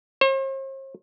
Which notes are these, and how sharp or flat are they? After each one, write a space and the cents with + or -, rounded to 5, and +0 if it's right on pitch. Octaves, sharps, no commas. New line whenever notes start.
C5 +45